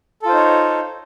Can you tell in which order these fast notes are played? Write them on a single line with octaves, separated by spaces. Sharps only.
A4 F4 C5 D#4 C#5